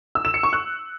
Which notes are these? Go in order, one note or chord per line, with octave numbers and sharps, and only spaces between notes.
E6
E7
C#7
C#6
F#6